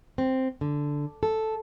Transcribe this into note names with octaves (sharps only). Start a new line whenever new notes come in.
C4
D3
A4